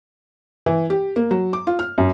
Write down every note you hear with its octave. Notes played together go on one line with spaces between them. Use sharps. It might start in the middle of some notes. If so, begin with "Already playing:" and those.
E3
G4
A#3
F#3
D6
F4
F6
F#2